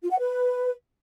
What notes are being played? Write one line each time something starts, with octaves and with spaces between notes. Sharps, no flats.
F4
F#5
B4